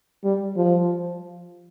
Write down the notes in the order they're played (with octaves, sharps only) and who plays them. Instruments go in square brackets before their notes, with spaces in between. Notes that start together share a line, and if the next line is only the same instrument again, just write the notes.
[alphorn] G3
F3